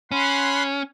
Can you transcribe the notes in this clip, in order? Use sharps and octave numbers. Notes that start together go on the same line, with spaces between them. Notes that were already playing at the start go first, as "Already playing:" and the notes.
C#4 F#5 B5 C6